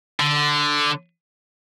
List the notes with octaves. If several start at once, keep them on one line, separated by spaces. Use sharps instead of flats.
D3